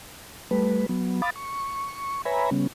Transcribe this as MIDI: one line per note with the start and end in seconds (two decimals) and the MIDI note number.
0.51 0.86 55
0.51 0.86 57
0.51 0.86 71
0.89 1.21 54
0.89 1.21 59
1.22 1.30 77
1.22 1.30 83
1.22 1.30 86
1.22 1.30 87
1.22 1.30 93
1.36 2.22 85
2.25 2.50 71
2.25 2.50 73
2.25 2.50 76
2.25 2.50 80
2.25 2.50 82
2.25 2.50 83
2.51 2.67 49
2.51 2.67 55
2.51 2.67 59
2.51 2.67 61